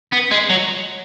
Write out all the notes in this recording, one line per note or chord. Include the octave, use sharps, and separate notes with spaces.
B3
G#3
F#3